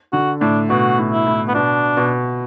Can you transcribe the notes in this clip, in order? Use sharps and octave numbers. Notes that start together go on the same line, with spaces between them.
D3 F#4
A2 D4
B2 F#4
A2
E4
A2
B3
B2 D4
B2